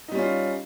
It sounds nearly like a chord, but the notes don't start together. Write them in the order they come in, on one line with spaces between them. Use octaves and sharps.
D#4 G3 C#4 F4